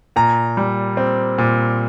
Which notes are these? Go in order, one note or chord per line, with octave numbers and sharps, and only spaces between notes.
A#2 A#5
G3
C4
A#2